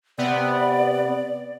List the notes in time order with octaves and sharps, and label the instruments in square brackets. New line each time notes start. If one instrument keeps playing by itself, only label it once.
[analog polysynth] C3 B3 [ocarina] D5